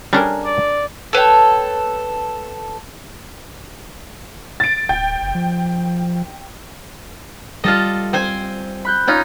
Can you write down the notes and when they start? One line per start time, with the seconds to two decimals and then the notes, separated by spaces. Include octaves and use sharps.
0.13 G3 C#4 D4 G#4 A#4
0.45 D5
1.13 A4 B4 C#5 G5
4.60 A6 D7
4.89 D1 G5
5.22 F#1
5.35 F3
7.64 G3 F4 A4 D#5 F6
8.13 C4 C5 G#5
8.85 B5 F#6 G6
9.07 C#4 D#4 F4